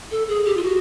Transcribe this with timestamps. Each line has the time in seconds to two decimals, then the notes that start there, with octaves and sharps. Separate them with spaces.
0.11 A4
0.28 G#4
0.46 G4
0.57 F4
0.63 F#4